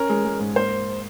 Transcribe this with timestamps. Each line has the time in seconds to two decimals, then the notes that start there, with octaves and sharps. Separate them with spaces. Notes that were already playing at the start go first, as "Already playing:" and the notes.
Already playing: C#4 A#4
0.09 G#3
0.25 G#3
0.40 G#2
0.55 A#3 C5